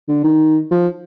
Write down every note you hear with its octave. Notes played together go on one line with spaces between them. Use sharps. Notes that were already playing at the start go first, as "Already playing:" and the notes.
D3
D#3
F3